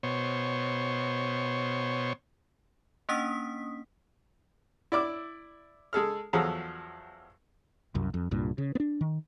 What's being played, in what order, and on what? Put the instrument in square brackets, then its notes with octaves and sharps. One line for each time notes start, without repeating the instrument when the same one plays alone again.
[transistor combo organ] B2 C5 C#5
[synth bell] A#3 C#4 D4 D#6 B6
[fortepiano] E4 D5 D6 E6
G#3 G#4 A4 F6
E2 F3 F#3 G#4 A4 A#5
[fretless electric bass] C2 F#2
F2
C2 G2 A#2
C#3
B3 D4
D#3